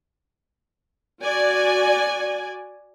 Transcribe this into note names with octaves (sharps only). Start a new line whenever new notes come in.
F#4 D5 G#5